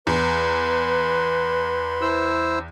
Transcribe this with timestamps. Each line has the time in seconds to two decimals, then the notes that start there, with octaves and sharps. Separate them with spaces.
0.07 E2 B4 B5 C6
2.02 E4 C5 E6